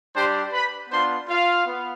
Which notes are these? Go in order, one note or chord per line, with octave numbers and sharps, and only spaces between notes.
G3 D4 G4 C5 C6
B4 B5
B3 D4 F4 C5 C6
F4 F5
B3